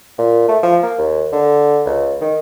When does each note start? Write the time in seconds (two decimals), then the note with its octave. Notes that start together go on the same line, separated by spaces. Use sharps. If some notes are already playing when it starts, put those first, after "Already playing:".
0.19 A#2
0.49 A3
0.63 F3
0.83 A#3
0.99 D#2
1.33 D3
1.86 C#2
2.21 D#3